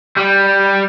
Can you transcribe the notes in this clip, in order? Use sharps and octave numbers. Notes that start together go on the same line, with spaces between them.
G3